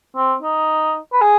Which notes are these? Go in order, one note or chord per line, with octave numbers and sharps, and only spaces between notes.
C4
D#4
B4
G#4